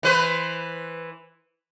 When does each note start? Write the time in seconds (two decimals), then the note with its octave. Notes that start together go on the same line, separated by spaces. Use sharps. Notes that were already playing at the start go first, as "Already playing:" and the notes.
0.03 E3 B4 C5